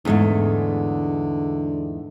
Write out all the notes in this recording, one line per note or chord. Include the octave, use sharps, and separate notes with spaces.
E2 G#2 D3 A3